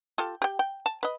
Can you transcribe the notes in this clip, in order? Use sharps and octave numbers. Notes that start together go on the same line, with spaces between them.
F4 G4 A4
G4 G5
G5
A5
B4 D#5